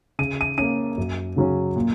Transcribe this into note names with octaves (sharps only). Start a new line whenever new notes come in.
C#3 D#7
D#7
A#3 C#4 D#7
F#2
C#3 F#3 C#4
A#2